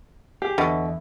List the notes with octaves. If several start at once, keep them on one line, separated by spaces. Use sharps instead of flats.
G4 G#4
E2 B2 D3 E5